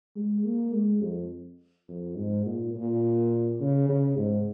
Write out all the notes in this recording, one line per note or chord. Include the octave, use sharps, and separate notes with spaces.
G#3
A#3
G#3
F2
F2
G#2
A#2
A#2
C#3
C#3
G#2